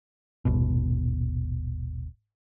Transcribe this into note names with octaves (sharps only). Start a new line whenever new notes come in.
D#1 G#1 B2